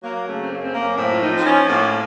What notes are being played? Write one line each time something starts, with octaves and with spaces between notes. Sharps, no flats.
F#3 A#3
C#3 A3
C4
F#2 A#3
C4
F#2 A#3
A2 C4
F4
F3 D#4
C4
F3 C#4
A2 A#3